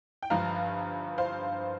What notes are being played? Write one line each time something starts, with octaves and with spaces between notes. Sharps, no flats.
G5
G1 G2 F3 F5 A#5
C5 F5